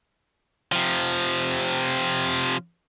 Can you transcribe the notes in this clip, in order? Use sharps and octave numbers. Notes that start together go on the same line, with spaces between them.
C3 F3